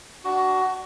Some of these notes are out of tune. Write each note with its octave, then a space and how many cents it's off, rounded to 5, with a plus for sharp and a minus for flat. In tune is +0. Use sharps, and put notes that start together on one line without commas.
D4 +0 F#4 +20